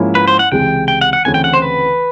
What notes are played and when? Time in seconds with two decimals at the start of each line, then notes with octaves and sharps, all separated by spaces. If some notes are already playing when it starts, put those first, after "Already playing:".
Already playing: G#2 F3 A#3 C#4 E4
0.15 B4
0.28 C5
0.39 F#5
0.52 C#2 C3 E3 G#3 G5
0.88 G5
1.01 F#5
1.13 F#5
1.25 D2 C#3 E3 A3 C4 G#5
1.34 G5
1.44 F#5
1.54 C5
1.62 B4